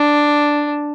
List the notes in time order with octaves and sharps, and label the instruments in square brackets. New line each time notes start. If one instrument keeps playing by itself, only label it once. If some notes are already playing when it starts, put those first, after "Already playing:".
Already playing: [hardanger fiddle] D4